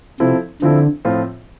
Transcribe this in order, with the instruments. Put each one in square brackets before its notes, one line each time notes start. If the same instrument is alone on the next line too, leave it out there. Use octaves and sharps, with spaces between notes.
[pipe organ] C3 [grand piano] F3 C4 E4 A4
[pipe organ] D3 [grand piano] F3 C4 E4 A4
[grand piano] A2 F3 C4 F4